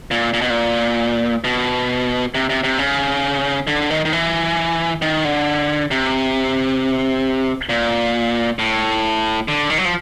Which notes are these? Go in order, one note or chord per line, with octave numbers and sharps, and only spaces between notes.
A#2
A#2
B2
A#2
B2
C3
C3
C3
C#3
D3
D#3
D#3
E3
D#3
D3
C3
A#2
A2
D3
D#3
F#3
F3